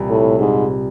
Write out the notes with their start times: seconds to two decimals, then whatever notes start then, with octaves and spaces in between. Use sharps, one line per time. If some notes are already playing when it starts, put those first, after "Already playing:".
Already playing: C2 A#2 G3
0.09 A2
0.39 G#2